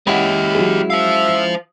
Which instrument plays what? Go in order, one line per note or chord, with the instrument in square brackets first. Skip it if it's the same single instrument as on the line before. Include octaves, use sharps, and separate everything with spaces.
[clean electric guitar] G#3 C#4 E4 [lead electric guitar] G4 D#5 [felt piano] F#5 B5
[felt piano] F#3 F#4 G#4
[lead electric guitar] C5 F5 [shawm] E5